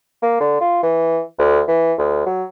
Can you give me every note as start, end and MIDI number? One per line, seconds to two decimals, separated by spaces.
0.22 0.38 58
0.40 0.60 50
0.61 0.81 65
0.83 1.20 52
1.38 1.61 38
1.67 1.93 52
1.98 2.26 38
2.26 2.44 54